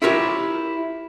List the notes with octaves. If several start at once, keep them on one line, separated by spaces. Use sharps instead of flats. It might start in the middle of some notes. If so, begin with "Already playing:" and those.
E4 F4 G4 A#4 C#5